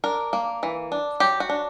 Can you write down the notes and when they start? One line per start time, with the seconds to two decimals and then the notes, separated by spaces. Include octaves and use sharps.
0.04 D4 A#4
0.33 A#3
0.63 E3
0.92 D4
1.20 F#3 G4
1.40 F#4
1.49 D4